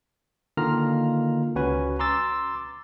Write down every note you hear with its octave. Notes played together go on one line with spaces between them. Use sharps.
D3 D#3 A#3 F4 A#5 F6
C#2 C#4 F#4 B4 G#5
A#5 C6 D6 E6 A6